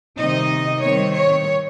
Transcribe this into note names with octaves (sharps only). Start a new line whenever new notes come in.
C3 D#3 G3 C4 D#4 D#5
D#3 G3 C4 C#5
C#5